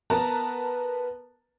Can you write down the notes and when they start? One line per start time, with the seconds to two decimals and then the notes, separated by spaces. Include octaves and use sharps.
0.10 B3 A#4 B4 A5 A#5